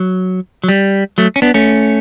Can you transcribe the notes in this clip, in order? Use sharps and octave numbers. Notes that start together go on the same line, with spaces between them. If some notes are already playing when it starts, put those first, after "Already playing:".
Already playing: F#3
F#3
G3
F#3 A3
C#4
B3 D4
A3 C#4